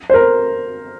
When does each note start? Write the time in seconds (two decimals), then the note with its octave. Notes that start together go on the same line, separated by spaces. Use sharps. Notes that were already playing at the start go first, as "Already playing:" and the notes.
0.10 C5
0.14 A#4